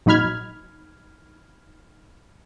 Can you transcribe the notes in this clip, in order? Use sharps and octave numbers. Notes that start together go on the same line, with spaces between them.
A#1 F#3 D#4 B5 F6 G#6